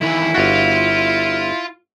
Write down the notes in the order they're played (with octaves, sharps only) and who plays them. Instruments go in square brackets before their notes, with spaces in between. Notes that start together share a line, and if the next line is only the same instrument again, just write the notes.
[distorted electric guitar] D#2 E3 [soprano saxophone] E4
[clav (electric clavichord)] G1 F#4 [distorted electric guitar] F4 F5